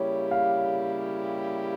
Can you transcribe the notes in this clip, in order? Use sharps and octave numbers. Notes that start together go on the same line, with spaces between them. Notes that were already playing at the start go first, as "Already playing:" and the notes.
Already playing: C#3 G3 A#3 E4 G4 C#5
F5